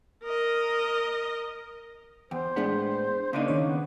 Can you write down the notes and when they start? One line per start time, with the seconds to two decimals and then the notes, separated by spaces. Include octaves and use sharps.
0.23 A#4 D#5
2.31 E2 C5 G5
2.56 A2 G#3 B3 D4 G#4
3.33 C#3 A#3 D4 D#4
3.48 D#3 C#5
3.66 B3